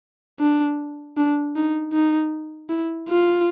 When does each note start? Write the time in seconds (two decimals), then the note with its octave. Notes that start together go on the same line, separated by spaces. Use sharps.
0.40 D4
1.17 D4
1.56 D#4
1.93 D#4
2.70 E4
3.09 F4